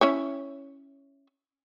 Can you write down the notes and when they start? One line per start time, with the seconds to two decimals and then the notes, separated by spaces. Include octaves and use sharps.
0.01 C#4 E4 C#5